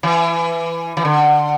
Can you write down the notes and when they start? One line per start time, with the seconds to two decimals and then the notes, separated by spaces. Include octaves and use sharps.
0.03 E3
0.97 E3
1.05 D3